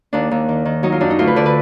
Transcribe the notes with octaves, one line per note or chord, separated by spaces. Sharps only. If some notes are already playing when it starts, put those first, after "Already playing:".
D#2 D4
D#2
D#3
D#3
F#3 D#4
F4
F#2 D4
D#4
D2 F4
B4
D3 D5
B4